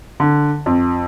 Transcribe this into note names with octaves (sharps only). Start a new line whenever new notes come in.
D3
F2